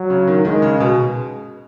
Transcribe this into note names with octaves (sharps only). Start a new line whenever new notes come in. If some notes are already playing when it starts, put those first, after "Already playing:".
Already playing: F#3
C#3
D#3
D#3 G#3
C#3
B2